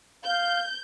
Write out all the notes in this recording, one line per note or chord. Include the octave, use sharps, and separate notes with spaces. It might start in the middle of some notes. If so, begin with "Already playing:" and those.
F5 G6